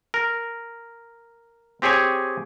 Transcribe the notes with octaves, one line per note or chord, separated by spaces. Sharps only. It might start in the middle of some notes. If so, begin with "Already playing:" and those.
A#4
C4 G4 G#4 C#5 G#5